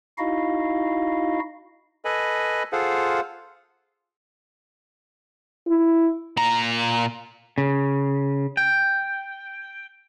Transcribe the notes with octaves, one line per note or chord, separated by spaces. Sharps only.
D#4 E4 F#4 D#5 F5
A4 B4 D#5 G#5 B5
F4 G#4 A4 C5 F5 F#5
E4
A#2 A#5
C#3
G5